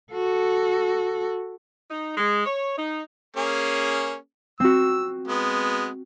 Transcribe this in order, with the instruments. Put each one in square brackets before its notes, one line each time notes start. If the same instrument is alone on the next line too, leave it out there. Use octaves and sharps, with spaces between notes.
[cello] F#4 A4
[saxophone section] D#4
G#3
C#5
D#4
[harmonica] A#3 C#4 G#4
[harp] C4 F#4 [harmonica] E6
[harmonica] G#3 B3